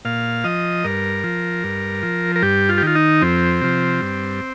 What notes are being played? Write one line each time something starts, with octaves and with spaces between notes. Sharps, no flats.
A#2 F5
F3 D#5
G2 A#4
F3
G2
F3
A#4
G2 G4
F4
G4
D#3 F4
D#4
F2 C4
C3 F3
G2